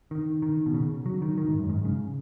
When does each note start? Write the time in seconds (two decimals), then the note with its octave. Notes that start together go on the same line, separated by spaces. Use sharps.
0.11 D#3
0.42 D#3
0.66 B2
0.74 C#3
1.06 F#3
1.22 D#3
1.38 D#3
1.48 G#2
1.58 F#2
1.69 G#2
1.85 C#3